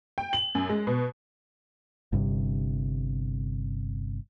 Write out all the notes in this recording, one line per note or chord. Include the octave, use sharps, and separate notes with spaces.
G5
F#7
F#2
G#3
B2
G1 G2 C3